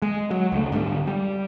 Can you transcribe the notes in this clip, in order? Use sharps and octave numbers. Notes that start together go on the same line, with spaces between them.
G#3
F#3
C#2 A3
G#2 D3 G3
G3